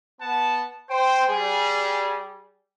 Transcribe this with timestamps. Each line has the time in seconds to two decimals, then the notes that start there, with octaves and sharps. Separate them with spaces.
0.21 B3 F#5 A5
0.89 C5 G5
1.29 G3 G#4